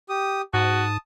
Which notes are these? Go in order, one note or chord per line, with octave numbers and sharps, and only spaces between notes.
G4 D#6
G#2 F#4 A5 D#6